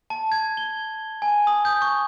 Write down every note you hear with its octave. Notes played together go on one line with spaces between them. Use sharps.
A5
G#6
G7
G#5
D#6
G6
C#6